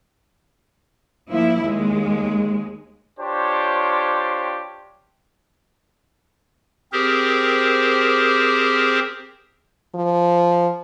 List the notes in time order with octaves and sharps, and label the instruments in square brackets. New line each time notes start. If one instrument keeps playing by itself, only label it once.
[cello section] F3 A#3 E4
D#2 G#3
[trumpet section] D4 F4 G4 C5 C#5
[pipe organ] C4 G4 G#4 A#4 C5
[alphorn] F3